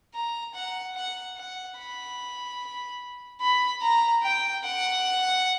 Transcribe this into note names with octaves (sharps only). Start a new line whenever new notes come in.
A#5
F#5
F#5
F#5
B5
B5
A#5
G5
F#5